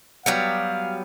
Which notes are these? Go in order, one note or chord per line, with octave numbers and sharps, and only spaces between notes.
F#3 G3 B3 F5